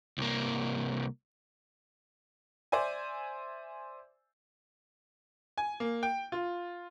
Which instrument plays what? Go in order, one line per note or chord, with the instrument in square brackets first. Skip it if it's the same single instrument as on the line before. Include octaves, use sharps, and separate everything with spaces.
[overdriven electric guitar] C2 A#3
[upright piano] C5 D5 E5 G#5
[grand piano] G#5
A#3
G5
F4